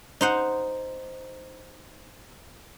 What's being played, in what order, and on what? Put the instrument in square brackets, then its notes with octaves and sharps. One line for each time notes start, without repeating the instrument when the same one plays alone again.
[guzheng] D#4 C5 F#5